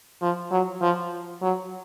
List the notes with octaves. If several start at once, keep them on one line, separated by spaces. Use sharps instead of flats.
F3
F#3
F3
F#3